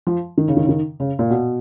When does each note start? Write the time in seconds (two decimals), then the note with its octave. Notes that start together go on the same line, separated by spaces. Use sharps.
0.07 F3
0.38 D#3
0.48 C#3
0.57 D#3
0.65 C#3
0.69 D#3
1.00 C#3
1.19 A#2
1.30 B2